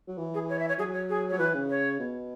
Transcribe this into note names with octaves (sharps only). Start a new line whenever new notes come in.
F#3
E3
G#4
C#5
E5
C#5
F#3 G#4
C#5
G#4
F#3 C#5
E3 B4
C#3
C#5
B2